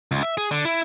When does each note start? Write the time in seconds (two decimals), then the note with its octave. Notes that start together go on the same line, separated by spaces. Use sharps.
0.11 C#2
0.23 E5
0.38 G#4
0.51 D3
0.65 E4